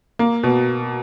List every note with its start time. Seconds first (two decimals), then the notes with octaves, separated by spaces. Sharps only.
0.19 A#3
0.43 B2